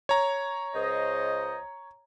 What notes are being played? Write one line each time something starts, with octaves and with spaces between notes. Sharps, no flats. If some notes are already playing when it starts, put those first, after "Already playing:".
C#5 A#5
C#2 C5 D#5